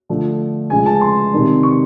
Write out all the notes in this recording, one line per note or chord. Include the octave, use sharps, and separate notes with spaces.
D3 F3 A3
C#3 F3 G#3 G#5
A5
C6
C3 D#3 G3
C#6